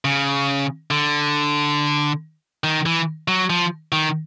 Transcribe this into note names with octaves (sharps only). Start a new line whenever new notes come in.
C#3
D3
D#3
E3
F#3
F3
D#3